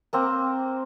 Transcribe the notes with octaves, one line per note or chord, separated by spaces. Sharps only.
A#3 C4 A#5